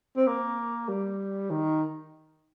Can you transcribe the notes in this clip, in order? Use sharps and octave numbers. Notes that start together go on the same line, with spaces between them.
C4
A#3
G3
D#3